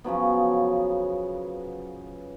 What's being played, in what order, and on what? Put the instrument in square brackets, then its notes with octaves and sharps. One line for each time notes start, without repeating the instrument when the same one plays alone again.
[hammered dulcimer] C#3 F3 F#3 B3